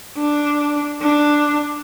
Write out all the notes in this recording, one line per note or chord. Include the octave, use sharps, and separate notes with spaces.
D4
D4